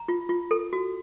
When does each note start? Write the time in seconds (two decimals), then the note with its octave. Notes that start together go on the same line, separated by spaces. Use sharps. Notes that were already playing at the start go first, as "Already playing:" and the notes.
Already playing: A#5
0.08 F4
0.29 F4
0.51 A4
0.73 F#4